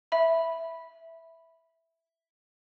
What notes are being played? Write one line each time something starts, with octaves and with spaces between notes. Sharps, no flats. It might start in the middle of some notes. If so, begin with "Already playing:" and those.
E5 B5